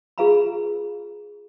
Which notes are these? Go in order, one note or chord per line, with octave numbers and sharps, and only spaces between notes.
F4 G#4 B4 F5 A#5 B5